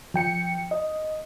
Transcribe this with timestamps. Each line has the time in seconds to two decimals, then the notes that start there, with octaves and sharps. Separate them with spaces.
0.14 F3 G5 C#7
0.71 D#5